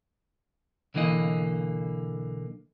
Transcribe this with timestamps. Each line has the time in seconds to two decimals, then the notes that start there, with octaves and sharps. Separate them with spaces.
0.94 B1 D3 E3 A#3 D#5